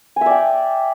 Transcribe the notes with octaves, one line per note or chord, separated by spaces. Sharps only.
D5 E5 G5 G#5